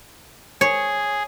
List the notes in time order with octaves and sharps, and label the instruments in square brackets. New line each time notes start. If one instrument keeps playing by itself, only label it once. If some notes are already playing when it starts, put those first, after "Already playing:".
[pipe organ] G#4 [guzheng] C#5